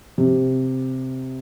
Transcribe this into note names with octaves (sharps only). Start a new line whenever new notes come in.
C3